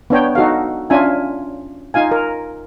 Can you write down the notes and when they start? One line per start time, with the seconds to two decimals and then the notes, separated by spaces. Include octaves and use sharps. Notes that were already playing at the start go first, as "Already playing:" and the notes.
0.10 B3 D4 C#5 G5
0.35 D#4 F#4 A4 F5
0.90 C#4 D4 F4 E5 G#5
1.94 D#4 F4 F5 G#5
2.11 A#4